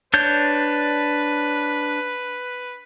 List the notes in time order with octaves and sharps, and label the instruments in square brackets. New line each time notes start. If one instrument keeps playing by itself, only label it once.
[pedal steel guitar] D4 C#5 G6 [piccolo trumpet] B4